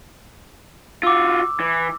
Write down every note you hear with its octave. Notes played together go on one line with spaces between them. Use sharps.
F4 F#4 D6 E6
E3